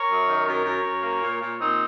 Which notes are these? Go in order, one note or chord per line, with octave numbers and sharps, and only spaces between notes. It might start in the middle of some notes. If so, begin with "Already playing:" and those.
Already playing: A#4 C#5
F#2
D#3
F#2 A#4 C#5
F#2
F#2
A#3
A#2
A#2
A#2 C4 D#4